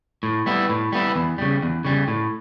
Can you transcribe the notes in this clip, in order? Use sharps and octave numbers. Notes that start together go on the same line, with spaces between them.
A2
G3 B3 E4
A2
G3 B3 E4
E2
C#3 G3
E2
C#3 G3
A2